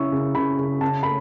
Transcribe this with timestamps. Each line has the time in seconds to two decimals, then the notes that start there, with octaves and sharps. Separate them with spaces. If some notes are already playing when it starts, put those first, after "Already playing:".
Already playing: C#3 C#4 E4 C#6 E6
0.12 C#3
0.35 C#3 B5
0.59 C#3
0.81 C#3 A5
1.03 A3 B5